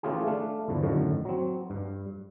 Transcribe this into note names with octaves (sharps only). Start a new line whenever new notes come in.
E3 A3 C#4 F4 G4 G#4
A3 D4 F5
E2 G2 D3 F3
F#2 A2 D3 D#3
F#3 C4
G2